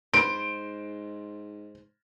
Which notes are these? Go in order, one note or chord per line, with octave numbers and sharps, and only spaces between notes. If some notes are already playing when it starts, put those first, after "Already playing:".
G#2 C5 D7